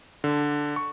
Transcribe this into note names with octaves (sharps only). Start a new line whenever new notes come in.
D3
C#6